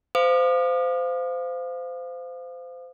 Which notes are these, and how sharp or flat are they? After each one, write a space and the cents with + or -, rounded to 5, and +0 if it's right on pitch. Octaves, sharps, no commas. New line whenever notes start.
C5 -25 F5 +0 D#6 -45